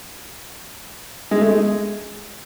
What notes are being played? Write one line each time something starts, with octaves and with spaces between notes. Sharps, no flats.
G#3
A3
G#3